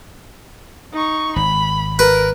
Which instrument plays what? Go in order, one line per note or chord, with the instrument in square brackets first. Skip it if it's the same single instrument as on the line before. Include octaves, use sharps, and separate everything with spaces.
[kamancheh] D#4 C#6
[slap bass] G#1 [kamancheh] B5
[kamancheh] A#4 [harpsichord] B4